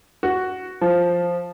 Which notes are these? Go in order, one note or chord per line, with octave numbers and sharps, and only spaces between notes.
F#4
F3